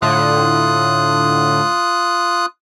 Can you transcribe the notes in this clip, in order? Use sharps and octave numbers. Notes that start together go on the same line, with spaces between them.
A2 D3 F4 D#6 F#6